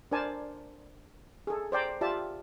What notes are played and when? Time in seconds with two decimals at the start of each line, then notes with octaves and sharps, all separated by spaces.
0.11 D4 A#4 C5 D5 G#5 A5
1.47 G#4 A4
1.72 C5 D5 G5 A#5
2.01 F4 G4 D5 E5 A5